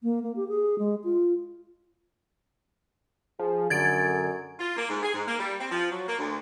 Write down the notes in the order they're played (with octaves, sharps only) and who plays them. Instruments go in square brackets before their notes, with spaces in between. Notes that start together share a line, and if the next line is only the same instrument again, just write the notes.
[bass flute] A#3
A#3
G4
G#4
G#3
F4
[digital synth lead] F3 [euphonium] G#4
[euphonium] F#2 [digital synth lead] D3 [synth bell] G#6 A6 D7
[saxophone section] F4
A#3
G#2
G#4
G#2
A#3
G3
C4
F3
F#3
A#3
D2